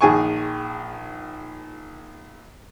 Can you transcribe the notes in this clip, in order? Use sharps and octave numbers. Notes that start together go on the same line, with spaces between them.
A#1 D#3 G#4 G#5 A5 C#6